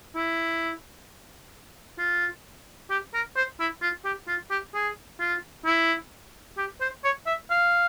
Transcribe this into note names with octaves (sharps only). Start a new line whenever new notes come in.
E4
F4
G4
A#4
C5
E4
F4
G4
F4
G4
G#4
F4
E4
G4
C5
C#5
E5
F5